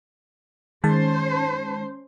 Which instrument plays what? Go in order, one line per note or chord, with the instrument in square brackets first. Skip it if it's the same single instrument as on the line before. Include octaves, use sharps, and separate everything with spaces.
[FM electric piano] D#3 G#3 A5 [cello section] C#4 C5